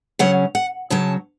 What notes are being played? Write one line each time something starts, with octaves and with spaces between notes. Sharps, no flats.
C#3 F#3 C#4 F#5
F#5
C#3 F#3 C#4 A5